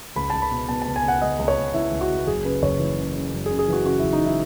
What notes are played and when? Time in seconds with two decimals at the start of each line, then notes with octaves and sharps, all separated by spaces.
0.16 C#2 B5
0.30 C#2 A5
0.42 B5
0.52 B2
0.69 B2 A5
0.82 A5
0.87 C#2
0.96 G#5
1.04 C#2 F#5
1.22 C#2 D#5
1.39 C#2
1.48 C#5
1.57 C#2
1.74 C#2 E4
1.92 C#2
2.01 F#4
2.10 C#2
2.27 F#1 G#4
2.45 C#3 B4
2.63 F#1 C#5
2.80 E3
2.98 C#3
3.15 C#3
3.33 F#2
3.46 G#4
3.51 C#3
3.59 G#4
3.68 E3 F#4
3.85 C#3 F#4
3.99 F#1 E4
4.13 D#4
4.21 E3
4.26 E4